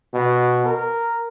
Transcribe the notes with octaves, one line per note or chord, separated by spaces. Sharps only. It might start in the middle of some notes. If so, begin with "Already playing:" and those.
B2
A#4